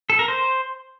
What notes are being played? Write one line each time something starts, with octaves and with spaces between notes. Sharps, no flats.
A4
A#4
C5